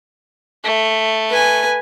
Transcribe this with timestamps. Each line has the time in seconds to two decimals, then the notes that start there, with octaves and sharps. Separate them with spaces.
0.64 A3
1.30 B4 G#5